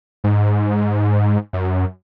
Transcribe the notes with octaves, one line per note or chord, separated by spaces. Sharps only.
G#2
F#2